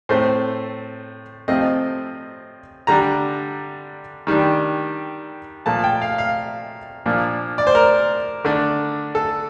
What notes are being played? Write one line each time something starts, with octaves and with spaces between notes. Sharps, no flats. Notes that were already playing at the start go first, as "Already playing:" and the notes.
A2 A3 C4 C5
C3 F3 A3 C4 D#5
D3 G3 D4 A#5
D#3 G3 D4
A#2 F3 A3 A5
G5
F5
F5
A#2 F3 A#3 D4
D5
C5
A#4
D3 A3 D4
A4